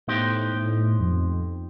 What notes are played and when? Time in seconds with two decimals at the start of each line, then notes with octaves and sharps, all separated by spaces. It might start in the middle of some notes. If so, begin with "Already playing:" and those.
0.08 A2 B3 D#4 G4 C5
0.54 A2
1.00 F2